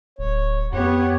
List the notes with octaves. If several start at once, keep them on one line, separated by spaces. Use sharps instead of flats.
D1 C#5
F2 B3 G4 C#5 F#5